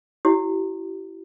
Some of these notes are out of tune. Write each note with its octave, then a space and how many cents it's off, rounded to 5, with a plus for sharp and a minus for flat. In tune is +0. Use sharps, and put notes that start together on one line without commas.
E4 +15 G4 -40